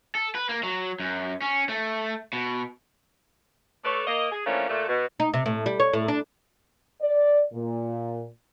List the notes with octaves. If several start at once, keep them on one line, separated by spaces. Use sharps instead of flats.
A4
B4
A#3
F#3
F#2
C#4
A3
B2
A3 A4 B4 C#5 D5
A#3 D#5
G#4
E3 F3 A3 A#3 C#4 D4
A#2 A3
B2
D#4
C3
A2
G3
C#5
A2
D4
D5
A#2